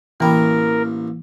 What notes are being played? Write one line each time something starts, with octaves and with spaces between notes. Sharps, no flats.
A1 E3 A#3 A#4 G5 B5